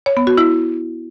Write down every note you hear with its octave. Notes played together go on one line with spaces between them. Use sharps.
C#5
B3
F#4
E4